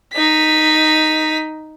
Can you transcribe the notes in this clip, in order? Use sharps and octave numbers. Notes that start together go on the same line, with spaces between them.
D#4 B6